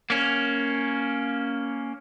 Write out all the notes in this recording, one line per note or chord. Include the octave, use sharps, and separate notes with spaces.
A#3 C#4